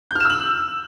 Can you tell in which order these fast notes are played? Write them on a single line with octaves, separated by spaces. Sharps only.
G6 F6 E7 E6 F#7